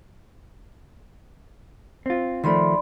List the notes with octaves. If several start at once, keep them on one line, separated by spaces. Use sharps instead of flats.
C4 F4
D#3 F3 A3 D5 B5 C6